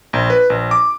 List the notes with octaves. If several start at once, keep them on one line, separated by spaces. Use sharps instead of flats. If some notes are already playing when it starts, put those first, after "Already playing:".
A#1
B4
A#1
D6